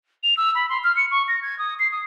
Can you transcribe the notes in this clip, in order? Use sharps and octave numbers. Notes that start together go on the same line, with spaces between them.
F7
E6
B5
C6
F6
C#7
C#6
A#6
G#6
D#6
C7
D#6